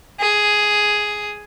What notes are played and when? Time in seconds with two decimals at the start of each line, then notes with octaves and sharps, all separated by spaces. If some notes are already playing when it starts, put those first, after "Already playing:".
0.20 G#4